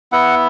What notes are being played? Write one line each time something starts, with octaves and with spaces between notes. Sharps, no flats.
B3 E4 F#5